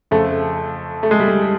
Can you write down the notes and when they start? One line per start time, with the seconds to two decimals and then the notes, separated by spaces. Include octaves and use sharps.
0.11 F2 C#3 F3 A3
1.03 A3
1.11 G#3
1.20 G3
1.28 G#3